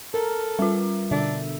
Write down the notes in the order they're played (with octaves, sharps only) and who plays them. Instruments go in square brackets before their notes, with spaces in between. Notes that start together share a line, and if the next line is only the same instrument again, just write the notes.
[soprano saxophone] A4 [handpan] A#4
[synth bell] G3 F4
[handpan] B2 D3 E5 [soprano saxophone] D4